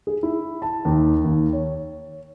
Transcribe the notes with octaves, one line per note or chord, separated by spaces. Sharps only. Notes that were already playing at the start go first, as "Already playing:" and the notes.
G#4
E4
A5
D#2
D#2
C#5